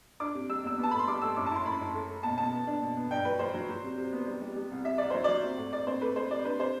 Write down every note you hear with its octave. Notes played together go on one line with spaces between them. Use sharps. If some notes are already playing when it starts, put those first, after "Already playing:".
D4 D6
C3
G3 E6
E2 E6
B3
A5
A2 B5
C6
G3 D6
A2 E6
F#2 D6
A5
E4 C6
F#2 B5
F#2
A3
A3
B2 A5
B2 A5
B3
D4
B2
B3
G2 G5
F#3 B4
F#3 C5
F#3
F#3
C3
C3
B3
G3
G3
G3
C2
C3 E5
C2 D5
F#3 C5
F#3 D5
C4
A2
A2 D5
C4 C5
A3 B4
A3 C5
C3 D5
D4 B4
C3 C5